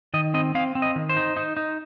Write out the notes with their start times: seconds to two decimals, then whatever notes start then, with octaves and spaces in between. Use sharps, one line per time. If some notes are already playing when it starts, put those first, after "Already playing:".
0.14 D#3 D#5
0.34 C4 D#5
0.55 C4 F5
0.75 C4
0.82 D#5
0.96 D#3
1.09 C5
1.17 D#4
1.37 D#4
1.57 D#4